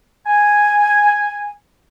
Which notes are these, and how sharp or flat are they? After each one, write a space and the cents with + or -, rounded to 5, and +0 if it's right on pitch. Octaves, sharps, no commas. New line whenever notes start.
G#5 -5